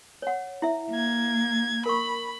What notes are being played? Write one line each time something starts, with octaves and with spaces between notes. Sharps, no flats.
C#5 F#5
E4 E5
A#3 G#6
A#4 B5 C#6